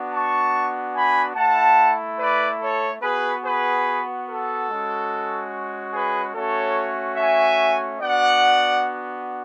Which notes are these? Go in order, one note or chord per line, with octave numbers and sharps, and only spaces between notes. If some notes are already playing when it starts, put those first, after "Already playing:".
Already playing: B3 D4 F#4
A5 C#6
G#5 B5
A3 E4 F#5 A5
B4 D5
A4 C#5
B3 F#4 G#4 B4
G#4 B4
A4
G#3 C#4 F#4
G#4 B4
A3 C#4 F#4 A4 C#5
E5 G#5
B3 D4 F#4 D5 F#5